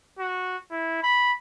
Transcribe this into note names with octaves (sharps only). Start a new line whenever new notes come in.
F#4
E4
B5